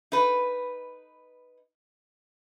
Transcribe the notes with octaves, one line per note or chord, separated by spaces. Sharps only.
D#4 B4